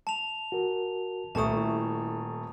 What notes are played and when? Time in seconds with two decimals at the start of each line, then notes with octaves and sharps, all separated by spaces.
0.07 A5 F7
0.52 F#4 A#4
1.35 D#1 C2 A3 A5 C#6 D#6
1.57 E4